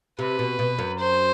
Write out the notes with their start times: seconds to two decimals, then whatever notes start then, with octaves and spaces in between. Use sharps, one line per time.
0.19 C3 B4
0.39 B2
0.59 B2
0.79 F#2
0.99 C5